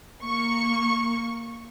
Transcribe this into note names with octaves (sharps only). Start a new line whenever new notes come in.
A#3 C#6